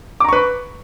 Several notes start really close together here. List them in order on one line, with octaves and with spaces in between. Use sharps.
D6 A#5 C#6 B4